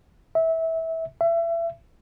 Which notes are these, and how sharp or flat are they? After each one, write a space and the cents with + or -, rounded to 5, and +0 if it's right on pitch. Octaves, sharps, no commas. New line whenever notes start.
E5 -20
E5 +30